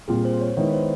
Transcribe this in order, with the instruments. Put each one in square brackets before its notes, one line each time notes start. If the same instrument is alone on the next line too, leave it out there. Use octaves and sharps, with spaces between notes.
[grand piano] A#2 G3 C4 F4 [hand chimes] G#4
[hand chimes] C5
C#5
[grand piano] D#3 G#3 B3 E4 [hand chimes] C#5
[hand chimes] C5